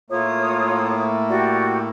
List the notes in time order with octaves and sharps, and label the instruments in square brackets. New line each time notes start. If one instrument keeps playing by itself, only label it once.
[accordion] A2 A3 A#3 [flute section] F4 C#5 D#6
[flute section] F#4 G4 D5